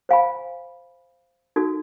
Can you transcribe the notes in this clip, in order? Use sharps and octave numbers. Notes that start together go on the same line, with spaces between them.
C5 F5 G#5 B5
D#4 F#4 A4